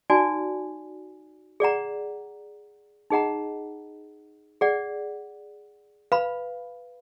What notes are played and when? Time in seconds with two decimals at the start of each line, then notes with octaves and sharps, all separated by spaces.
0.10 D#4 F#4 D5 G#5
1.60 G#4 D5 F#5 A#5
3.10 D#4 G#4 D#5 F#5 A#5
4.61 G#4 D5 F#5
6.12 B4 F5 B5